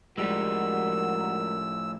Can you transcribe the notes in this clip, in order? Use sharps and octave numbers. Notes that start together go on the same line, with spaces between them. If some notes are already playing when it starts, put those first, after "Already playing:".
A2 F3 G3 G#3 F#4 A#4 E6